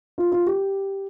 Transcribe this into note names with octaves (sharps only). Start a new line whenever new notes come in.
F4
F4
G4